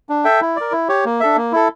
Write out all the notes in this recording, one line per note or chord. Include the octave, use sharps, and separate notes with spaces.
D4
A4 E5 G5
E4
A#4 D5
E4
G4 C#5
A#3
D4 A4 E5
A#3
E4 A4